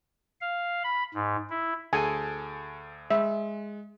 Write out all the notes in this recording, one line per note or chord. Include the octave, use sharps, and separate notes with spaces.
F5
B5
G#2
E4
D2 G#4 A4 G#5
G#3 E5